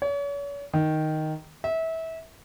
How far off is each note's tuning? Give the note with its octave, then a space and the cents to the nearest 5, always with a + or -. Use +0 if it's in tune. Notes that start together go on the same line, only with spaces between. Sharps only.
C#5 +40
D#3 +0
E5 -25